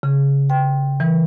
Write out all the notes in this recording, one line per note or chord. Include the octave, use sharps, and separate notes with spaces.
C#3
G5
E3